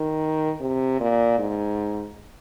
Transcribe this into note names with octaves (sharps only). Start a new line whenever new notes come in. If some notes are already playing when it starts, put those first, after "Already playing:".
Already playing: D#3
C3
A#2
G#2